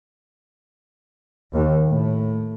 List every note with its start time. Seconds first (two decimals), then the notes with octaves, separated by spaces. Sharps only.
1.53 D#2
1.87 A2